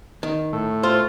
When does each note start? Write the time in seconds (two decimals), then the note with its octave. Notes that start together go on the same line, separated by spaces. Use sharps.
0.23 D#3
0.53 A2
0.83 F4 C5